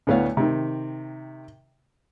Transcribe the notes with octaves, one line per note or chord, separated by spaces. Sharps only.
D2 A2 B3 C#5 F5
C3 D#3